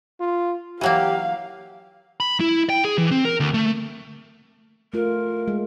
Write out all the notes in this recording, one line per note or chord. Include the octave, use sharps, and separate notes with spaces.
F4
E3 F#3 A#3 G4 F5
B5
E4
G5
G#4
E3
C4
A#4
D2
A3
A3 F4 A#4
G#3